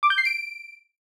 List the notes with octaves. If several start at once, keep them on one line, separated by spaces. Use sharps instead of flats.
D6
G6
C7
D7